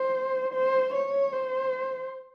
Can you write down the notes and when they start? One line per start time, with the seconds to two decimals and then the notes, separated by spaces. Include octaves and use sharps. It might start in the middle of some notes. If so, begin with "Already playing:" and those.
Already playing: C5
0.54 C5
0.94 C#5
1.32 C5